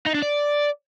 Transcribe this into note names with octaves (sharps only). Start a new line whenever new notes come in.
D#4
D4
D5